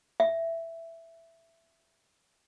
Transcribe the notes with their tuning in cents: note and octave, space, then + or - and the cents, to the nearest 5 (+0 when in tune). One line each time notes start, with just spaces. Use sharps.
E5 +5